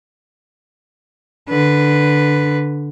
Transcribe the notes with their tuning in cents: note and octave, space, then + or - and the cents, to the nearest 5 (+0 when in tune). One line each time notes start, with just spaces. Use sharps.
D3 +0 B4 +0